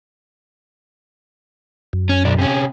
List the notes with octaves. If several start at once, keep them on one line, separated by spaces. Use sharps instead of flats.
F#2
C#4
B1 D4
C3 C#4